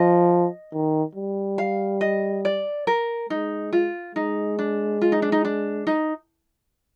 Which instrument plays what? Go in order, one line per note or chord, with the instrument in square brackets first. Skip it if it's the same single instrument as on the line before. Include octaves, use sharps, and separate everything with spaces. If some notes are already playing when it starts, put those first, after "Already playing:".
Already playing: [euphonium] F3 [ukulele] D#5
[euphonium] D#3
G3
[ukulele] F5
D#5
D5
A#4
[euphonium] G#3 [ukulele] D#4
[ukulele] F4
[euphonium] G#3 [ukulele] D#4
[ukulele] D4
F4
D#4
D4
D#4
D4
D#4